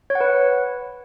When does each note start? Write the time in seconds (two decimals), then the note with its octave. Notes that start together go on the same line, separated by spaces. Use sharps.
0.10 C#5
0.15 F#5
0.21 B4